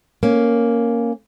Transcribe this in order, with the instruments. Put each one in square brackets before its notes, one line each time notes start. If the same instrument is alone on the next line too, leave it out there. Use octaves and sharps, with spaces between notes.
[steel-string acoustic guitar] A#3 C#4